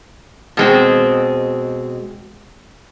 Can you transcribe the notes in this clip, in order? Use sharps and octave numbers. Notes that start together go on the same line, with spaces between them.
B2 G#3 C4